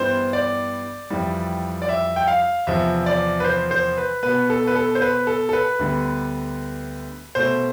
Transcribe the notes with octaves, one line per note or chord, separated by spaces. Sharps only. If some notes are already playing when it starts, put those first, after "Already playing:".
Already playing: G2 E3 G3 B3 C5
D5
F2 E3 G3
D5
E5
G5
F5
E2 C3 F3 E5
D5
B4
C5
C5
B4
B2 B3 B4
A4
B4
A4
C5
B4
A4
A4
B4
D2 D3 G3 B3
B2 A3 C5